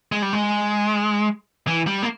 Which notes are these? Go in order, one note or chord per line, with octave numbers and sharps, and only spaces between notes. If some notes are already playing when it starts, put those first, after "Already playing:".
G#3
G3
G#3
E3
G3
A#3